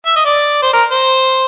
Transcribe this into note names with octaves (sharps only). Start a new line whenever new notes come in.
E5
D#5
D5
C5
A#4
C5